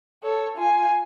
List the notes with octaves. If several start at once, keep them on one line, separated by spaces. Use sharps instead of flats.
A4 C#5
F4 G#5